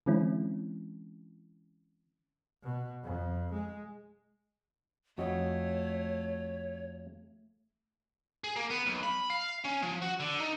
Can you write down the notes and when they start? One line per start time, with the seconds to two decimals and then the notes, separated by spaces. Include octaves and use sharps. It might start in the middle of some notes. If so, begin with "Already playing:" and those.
0.06 D3 E3 G#3 C4 C#4 E4
2.64 B2
3.04 F2
3.54 G#3
5.18 F2 A3 F#4 C#5 D#5
8.44 G#4
8.56 A#3
8.71 B3
8.86 B1
9.03 B5
9.30 F5
9.65 C#4
9.83 F3
10.02 F#4
10.20 D3
10.40 D#4